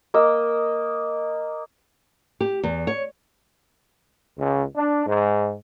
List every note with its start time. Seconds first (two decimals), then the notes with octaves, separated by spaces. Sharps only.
0.14 A#3 D#5 E6
2.40 G4
2.63 E2
2.87 C#5
4.38 C#2
4.76 D4
5.06 G#2